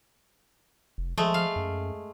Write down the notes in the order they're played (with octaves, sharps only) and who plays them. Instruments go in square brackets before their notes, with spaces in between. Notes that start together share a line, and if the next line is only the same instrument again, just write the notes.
[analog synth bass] F1
[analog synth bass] F3 [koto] G#3 A3
[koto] F5
[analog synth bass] F#2